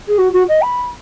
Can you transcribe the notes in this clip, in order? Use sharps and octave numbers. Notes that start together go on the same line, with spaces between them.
G#4
F#4
F#4
D#5
B5